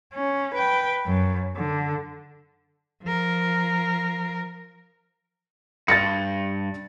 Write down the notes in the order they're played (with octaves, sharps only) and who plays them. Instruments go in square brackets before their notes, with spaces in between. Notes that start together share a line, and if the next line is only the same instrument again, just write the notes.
[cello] C#4
B4 G5
F#2
D3
F3 A#4
[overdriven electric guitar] G2 [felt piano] A6 A#6 C#7